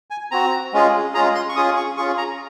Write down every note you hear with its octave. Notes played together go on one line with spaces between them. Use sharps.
G#5
C4 F#4 A#5
G#3 C#4 F4 G#4
G#3 C#4 F4 G#4 A#5
C6
C#6
C#4 F4 G#4 D#6
C#6
C#4 F4 G#4 C#6
A#5